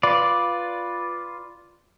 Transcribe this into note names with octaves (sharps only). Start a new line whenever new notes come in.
F4 B4 D5